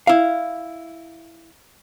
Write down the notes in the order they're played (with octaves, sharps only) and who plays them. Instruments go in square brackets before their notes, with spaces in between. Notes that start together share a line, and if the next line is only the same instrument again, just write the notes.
[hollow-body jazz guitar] E4 F5